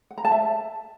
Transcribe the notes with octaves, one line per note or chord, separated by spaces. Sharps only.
F#5
A#5
A5
E5